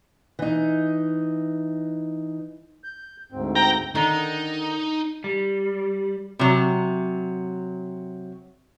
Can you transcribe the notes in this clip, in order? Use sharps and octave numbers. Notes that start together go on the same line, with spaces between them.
E3 D#4
G6
D2 G#2 C4
G5 A#5
D3 D#3 D#4
G3
C3 F#3